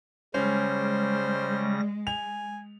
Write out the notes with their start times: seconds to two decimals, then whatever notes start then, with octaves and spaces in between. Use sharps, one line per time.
0.34 C#3 G3 G#3 C#4 C5 A#6
2.07 G#5 F7